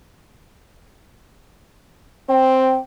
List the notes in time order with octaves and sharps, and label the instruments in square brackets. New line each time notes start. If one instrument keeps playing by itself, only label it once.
[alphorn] C4 [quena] G5